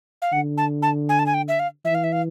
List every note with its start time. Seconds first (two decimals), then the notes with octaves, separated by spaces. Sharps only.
0.22 F5
0.32 D3 F#5
0.57 A5
0.82 A5
1.09 G#5
1.19 A5
1.26 G#5
1.34 G5
1.48 E5
1.59 F5
1.85 E3 E5
1.95 F5
2.04 E5
2.12 F5